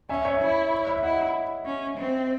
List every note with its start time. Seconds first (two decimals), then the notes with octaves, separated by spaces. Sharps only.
0.09 C#4 E5 G#5
0.25 C#5 E5
0.41 E4 C#5
0.72 C#5
0.87 C#5 E5
1.03 E4 D#5 F#5
1.66 C#4
1.97 C4